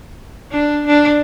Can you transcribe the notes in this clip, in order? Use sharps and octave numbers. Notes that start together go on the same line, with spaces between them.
D4
D4